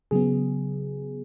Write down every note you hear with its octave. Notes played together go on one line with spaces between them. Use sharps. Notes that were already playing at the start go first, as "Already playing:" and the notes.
C#3 F#3 B3 G#4